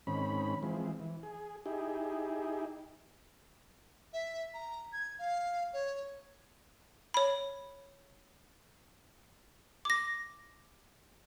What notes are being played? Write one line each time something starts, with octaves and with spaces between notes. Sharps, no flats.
G#2 D#3 C4 C#4 B5
E3 F3 G#3 C4
E3
G#4
D#4 E4 G4 G#4
E5
A#5
G#6
F5
C#5
C#5 B5
D6 A#6